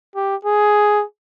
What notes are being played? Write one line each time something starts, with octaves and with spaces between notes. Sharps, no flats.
G4
G#4